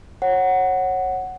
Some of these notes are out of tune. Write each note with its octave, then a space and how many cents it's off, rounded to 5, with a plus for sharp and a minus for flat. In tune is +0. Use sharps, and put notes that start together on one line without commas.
C#5 -20 F#5 +5